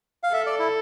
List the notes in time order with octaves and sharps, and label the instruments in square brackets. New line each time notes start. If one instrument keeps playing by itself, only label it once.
[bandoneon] F5
[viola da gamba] A4 [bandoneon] E5
[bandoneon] D5
E4